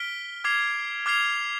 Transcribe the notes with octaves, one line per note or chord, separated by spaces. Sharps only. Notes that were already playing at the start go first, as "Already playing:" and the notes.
Already playing: F6 B6 D7 G7
D6 F6 G#6 C7 F7
D6 F6 G#6 C7 F7